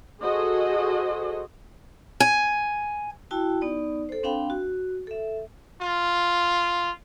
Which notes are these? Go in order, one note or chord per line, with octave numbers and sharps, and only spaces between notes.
F#4 G#4 A4 C5 D#5
G#5
E4 F#4 G5 A5
B3 D#4 D5
A4 C5
C4 D4 F5 G5 B5
F#4
A4 E5
F4